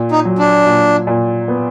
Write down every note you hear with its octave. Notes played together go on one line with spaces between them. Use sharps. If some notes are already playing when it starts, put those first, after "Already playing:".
Already playing: A#2
D#4
F#3
D4
A#2
A#2
B3